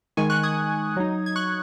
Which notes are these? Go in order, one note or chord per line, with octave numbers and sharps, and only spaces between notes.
D#3 G#3 D#4 G#5 C#6
C#6 F#6
D#6 G#6
F#3 D#4
G#6
C#6 F#6